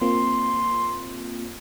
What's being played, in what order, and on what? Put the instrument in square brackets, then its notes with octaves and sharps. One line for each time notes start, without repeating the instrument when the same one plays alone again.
[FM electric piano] A#3 C4 F4 [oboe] C6